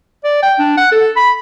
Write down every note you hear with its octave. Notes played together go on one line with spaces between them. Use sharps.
D5
G5
D4
F#5
A4
B5